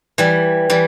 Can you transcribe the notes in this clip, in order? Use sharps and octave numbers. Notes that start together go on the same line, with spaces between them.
E3 G3
E3 G3